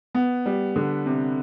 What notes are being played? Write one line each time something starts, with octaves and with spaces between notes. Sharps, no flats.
B3
G3
D3
C3